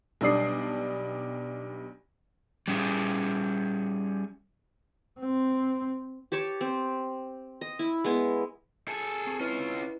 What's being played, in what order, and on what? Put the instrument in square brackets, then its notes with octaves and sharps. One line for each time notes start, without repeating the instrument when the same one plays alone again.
[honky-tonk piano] B1 G3 D4 D5 D#6 C7
[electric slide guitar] G3 C#4 G#4
[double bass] C4
[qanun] G4 C#5 A5 C#6
C4
D#5
E4
G#3 B3 E4
[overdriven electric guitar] G#4 A4
[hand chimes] C4 C#6 C7
[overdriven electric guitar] C#4 F4 [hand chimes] E4 B4 D#5